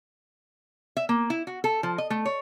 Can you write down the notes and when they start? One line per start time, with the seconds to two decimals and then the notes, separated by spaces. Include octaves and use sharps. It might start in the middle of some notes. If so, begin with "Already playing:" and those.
0.97 E5
1.09 A#3
1.30 E4
1.47 F#4
1.64 A4
1.83 F3
1.98 D#5
2.10 A3
2.25 C#5